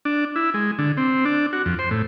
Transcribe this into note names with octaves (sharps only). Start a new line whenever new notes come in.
D4
E4
G#3
D3
C4
D4
F#4
F2
C5
A2